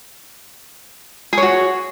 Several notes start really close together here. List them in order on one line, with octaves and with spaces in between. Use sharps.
G#4 C#5 F#4